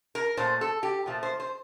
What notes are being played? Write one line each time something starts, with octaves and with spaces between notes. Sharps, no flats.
A#4
A#2 A3 C5
A4
G4
A#2 F3 A3
C5
C5